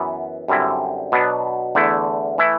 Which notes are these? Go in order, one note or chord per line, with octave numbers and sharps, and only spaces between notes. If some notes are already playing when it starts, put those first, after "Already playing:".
Already playing: F#2 E3 B3
F#2 D3 G3 C4 E4
B2 F#3 B3 D4
E2 D3 A3 E4
E3 A3 E4